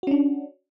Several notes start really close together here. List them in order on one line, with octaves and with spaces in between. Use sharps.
F#4 C#4 D4